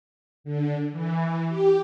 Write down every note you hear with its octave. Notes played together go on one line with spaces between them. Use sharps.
D3
E3
G4